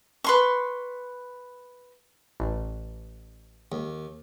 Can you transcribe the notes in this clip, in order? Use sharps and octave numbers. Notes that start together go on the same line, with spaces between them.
B4 C6 C#6
A1
D#2